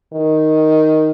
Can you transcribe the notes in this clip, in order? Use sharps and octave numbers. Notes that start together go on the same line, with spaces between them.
D#3